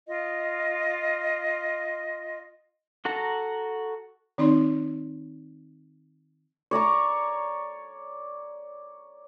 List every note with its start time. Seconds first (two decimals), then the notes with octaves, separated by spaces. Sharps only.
0.08 F4 D#5
3.05 F#4 A4 F#5 A#5
4.38 D#3 C4 D#4 D5 C6
6.71 C#5 D5 A#5 C#6